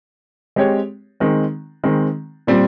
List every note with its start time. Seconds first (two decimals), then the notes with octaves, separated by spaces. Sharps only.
0.56 G#3 C4 G4 C#5
1.20 D#3 G#3 C4
1.84 D#3 G#3 C4
2.47 A#2 G3 C4